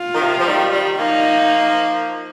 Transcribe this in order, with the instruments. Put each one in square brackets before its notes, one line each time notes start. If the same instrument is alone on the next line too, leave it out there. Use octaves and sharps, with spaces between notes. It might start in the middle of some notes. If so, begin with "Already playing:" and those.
Already playing: [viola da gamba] F4
[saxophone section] D#3
C3 F3
F3
D#3 G3
D#3 G3
[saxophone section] F3 A#3 [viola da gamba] D#4